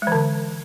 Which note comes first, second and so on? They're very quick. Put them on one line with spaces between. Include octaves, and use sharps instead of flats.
G#3 E3 D3